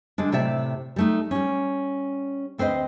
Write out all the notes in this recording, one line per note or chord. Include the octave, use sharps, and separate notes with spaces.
D3 G3 G#3 D4
A2 C3 G4 D5 E5 A5
G3 A3 D#4
G3 C#4
D2 C4 B4 C5 D#5